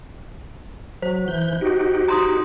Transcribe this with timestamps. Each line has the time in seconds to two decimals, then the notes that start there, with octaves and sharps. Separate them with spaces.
1.02 F#3 C5
1.28 E3 G6
1.61 D#4 F#4 G4
2.08 A#5 C6 D#6